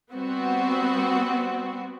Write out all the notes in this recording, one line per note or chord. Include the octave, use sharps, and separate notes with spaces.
G3 B3 C4 F#4